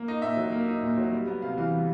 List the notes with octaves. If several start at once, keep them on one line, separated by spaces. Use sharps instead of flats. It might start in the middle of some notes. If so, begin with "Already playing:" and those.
Already playing: A#3
D#4
A#2 E5
F#3
A#3
D#4
A#2
F#3
G3
B3
C3 F5
E3 F5
G3